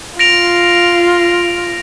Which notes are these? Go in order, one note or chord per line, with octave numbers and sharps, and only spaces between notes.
F4 A#6 D7 F7